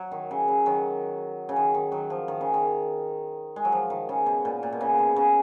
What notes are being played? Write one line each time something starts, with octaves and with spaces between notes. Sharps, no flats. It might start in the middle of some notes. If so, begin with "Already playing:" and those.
Already playing: F#3
D#3
C#3
C#3
D#3 F#3
C#3
D#3
D#3
D#3 F#3
F3
D#3
C#3
D#3
G#3
F#3
F3
D#3
C#3
B2
A#2
A#2
B2
C#3
B2
C#3